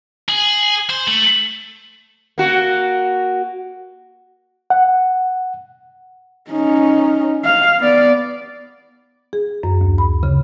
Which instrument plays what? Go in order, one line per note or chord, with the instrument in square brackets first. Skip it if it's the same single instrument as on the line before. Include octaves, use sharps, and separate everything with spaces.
[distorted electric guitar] G#4 [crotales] F#7
[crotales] C7
[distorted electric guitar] C5
[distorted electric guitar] A3 [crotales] F#7
[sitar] A#3 F#4
[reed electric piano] F#5
[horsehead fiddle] C#4 D#4
F5
B3 D5
[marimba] G#4
F#2
D2
B5
C#3